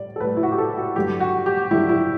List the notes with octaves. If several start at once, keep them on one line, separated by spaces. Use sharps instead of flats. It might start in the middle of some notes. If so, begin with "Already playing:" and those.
Already playing: A2 G3 D5
A4
A2 G3 B4
E4
F#4
G4
A4
F#4
G2 D3 F#3 G4
F#4
G4
G2 D3 F#3 E4
E4